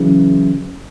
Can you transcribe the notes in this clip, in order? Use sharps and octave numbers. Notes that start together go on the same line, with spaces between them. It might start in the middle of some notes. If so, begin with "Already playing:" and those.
Already playing: F#2 C#3 E3